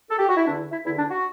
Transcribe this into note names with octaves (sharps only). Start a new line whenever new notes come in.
A4
G4
F#4
E4
E2 D3 D4
E4
E2 D3 E4
D4
F#4